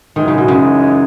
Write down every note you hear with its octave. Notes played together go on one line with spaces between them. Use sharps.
F#2 D#3 E3 G#3 D#4
C#3
B2
C#3